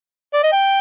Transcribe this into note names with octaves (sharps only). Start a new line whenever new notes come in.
D5
D#5
G5